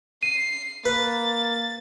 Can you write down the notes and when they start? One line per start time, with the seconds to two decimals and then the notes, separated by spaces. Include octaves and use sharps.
0.23 C7 D#7
0.85 A#3 B4 A6